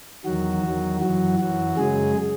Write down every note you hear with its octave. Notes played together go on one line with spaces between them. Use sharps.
E2 D#3 F#3 F#4
E2 D#3 F#3
F#2 E3 F#3 F#4
F#2 E3 F#3 F#4
F#2 C#3 F#3 G#3 G#4